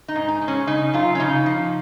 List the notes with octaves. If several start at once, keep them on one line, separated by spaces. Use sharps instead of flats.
D#4
G#2
D#4
G#3
C#4
C#3 D#4
F#2 F4
C#4
C#3 D#4
F3